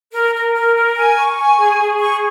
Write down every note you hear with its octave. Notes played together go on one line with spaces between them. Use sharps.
A#4
A#4
A#4
A#4
G#5
C#6
G#5
G#4
G#4
C#6